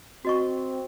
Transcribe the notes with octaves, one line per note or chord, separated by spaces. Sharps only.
C4 F#4 D#5 C#6